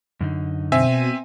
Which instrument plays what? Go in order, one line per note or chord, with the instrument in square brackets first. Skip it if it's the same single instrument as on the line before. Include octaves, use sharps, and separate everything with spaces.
[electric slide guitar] F#2 D3 D#4
[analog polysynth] B2 D#7 [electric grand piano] C4 E5 G#5